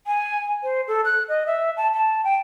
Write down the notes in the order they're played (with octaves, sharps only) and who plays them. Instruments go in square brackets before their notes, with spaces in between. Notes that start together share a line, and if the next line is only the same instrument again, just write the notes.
[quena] G#5
C5
A4
F#6
D#5
E5
A5
A5
G5